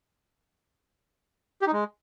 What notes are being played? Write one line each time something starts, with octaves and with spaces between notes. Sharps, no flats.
G4
D#4
G#3